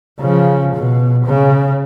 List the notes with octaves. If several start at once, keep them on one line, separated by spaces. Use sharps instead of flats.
C#3 F3
B2
C#3